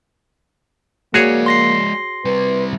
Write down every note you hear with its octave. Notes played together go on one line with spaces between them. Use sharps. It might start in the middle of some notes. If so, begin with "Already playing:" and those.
G#3 A#3 F#4 G#4 C#5 D5
C6 A#6 C7
G3 C4 B4